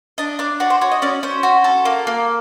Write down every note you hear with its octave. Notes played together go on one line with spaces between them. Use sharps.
D4 D#5
D4 D5
F#4 D5
C5
F#4 C#5
D#5
C#4 D5
C#4 C5
F#4
A4
A#3
A#3